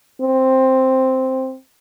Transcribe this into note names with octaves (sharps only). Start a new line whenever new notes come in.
C4